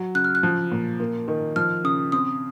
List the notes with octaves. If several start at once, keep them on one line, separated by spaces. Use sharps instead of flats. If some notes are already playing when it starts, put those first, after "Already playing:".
Already playing: F#3
C#3 F#6
F6
F#6
F3
A#2
A#3
D#3
F3 F6
C#3 D#6
C4 D#6